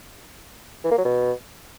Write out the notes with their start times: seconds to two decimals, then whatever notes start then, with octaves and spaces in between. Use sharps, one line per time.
0.84 E3
0.91 A#3
0.98 F#3
1.05 B2